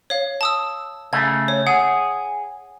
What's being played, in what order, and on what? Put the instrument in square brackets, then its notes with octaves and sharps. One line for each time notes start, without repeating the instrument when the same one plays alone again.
[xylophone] C#5 F5
A5 D#6 E6
[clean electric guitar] C#3 A3 [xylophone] G#6
[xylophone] C#5
[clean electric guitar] G#4 [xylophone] F#5